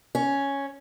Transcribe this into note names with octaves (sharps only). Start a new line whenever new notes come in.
C#4